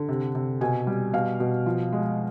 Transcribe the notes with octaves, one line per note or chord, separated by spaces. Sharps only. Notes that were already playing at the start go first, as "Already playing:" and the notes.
Already playing: D3
C3
C3
B2 G#5
G3
B2 F5
B2
F3
G#3